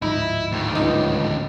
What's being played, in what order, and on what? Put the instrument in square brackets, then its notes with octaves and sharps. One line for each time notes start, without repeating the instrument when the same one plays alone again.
[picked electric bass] D1 G#2 F3 [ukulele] D#4 [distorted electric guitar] E4
[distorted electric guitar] D2 D#3
[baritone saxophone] C#2 [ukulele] D#4